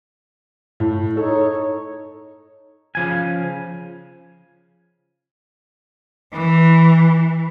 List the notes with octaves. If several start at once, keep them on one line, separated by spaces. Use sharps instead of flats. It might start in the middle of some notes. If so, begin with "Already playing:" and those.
A2
D#4 A4 C#5
C#3 F3 G#5
E3